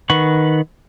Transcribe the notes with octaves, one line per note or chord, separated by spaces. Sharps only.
D#3 B4 F#5 C#6